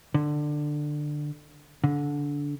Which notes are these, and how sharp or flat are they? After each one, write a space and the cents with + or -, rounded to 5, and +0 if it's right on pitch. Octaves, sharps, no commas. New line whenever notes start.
D3 +15
D3 -20